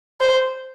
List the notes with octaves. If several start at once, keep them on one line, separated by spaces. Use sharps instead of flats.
C5